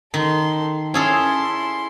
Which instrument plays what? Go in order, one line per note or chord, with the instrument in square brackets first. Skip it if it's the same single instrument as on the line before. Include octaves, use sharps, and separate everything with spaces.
[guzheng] D#3 [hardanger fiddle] A4 C6
[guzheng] C#4 G#4 A4 [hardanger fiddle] E4 C6